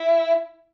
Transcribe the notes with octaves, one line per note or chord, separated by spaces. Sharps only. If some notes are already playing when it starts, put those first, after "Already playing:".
Already playing: E4